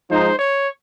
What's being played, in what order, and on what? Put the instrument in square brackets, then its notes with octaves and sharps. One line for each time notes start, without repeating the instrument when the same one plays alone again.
[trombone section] F3 G#3 D#4 [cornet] C5
[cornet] C#5